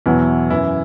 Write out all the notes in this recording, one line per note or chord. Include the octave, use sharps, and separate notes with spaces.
E2 B2 F#3 E4
F#2 E3 E4